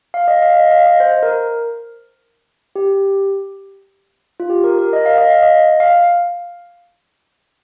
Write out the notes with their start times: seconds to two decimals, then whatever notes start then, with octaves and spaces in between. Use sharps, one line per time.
0.14 F5
0.28 D#5
0.42 F5
0.57 D#5
0.71 F5
0.86 D#5
1.00 C5
1.23 A#4
2.76 G4
4.40 F4
4.50 G4
4.64 A#4
4.79 A#4
4.93 D#5
5.06 F5
5.18 D#5
5.31 F5
5.43 D#5
5.80 F5